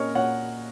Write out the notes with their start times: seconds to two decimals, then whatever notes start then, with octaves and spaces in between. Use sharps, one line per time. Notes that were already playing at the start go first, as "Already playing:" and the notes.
Already playing: A#2 A#3 C#4 A#4 C#5 D#5
0.15 A#2 C#5 F#5